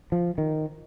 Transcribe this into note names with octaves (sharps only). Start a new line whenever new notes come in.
F3
D#3